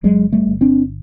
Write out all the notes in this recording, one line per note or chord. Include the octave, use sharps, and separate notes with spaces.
G1 F#3 G#3
G3 A3
G1
C4 D4